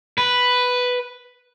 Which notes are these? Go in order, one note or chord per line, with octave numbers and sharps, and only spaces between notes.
B4